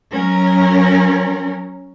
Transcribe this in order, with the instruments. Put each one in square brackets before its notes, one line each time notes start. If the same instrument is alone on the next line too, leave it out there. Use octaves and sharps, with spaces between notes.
[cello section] F#3 C#4 A#4